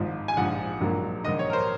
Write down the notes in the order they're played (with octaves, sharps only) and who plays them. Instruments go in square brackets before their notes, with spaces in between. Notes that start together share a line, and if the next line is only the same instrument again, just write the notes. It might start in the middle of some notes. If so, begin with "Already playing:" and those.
Already playing: [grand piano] G#1 G#2 F3
G#5
A#1 G#2 F3 F#5
A#1 G#2 F#3 A#3
A#1 G#2 D#3 D#5
C#5
A#4
C5